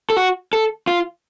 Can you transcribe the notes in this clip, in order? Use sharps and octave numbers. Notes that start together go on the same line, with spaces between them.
A4
F#4
A4
F4